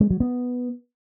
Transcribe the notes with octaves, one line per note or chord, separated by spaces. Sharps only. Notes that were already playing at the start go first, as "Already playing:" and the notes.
G#3
F#3
B3